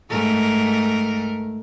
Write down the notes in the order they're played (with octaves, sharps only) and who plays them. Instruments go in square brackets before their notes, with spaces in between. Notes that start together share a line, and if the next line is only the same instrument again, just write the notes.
[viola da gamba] G#2 A3 A#4